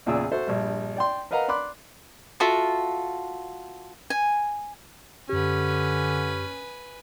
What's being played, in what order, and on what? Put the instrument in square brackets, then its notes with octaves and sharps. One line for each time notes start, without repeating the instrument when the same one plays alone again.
[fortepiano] E2 A#2 C#3 G#4 D5 E6
F#4 A4 C5 E5
A#1 G2
D5 G5 C6
A#4 B4 D#5 F5 F#5 A#5
D5 B5 C6 D6 F#6
[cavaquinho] F4 F#4 A4 E5
G#5
[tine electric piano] F#2 G4 [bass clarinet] D3 [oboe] C#4 [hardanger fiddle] B4 G#5